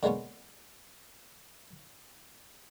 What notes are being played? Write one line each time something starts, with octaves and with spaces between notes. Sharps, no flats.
D3 G#3 A#3 B3 C#4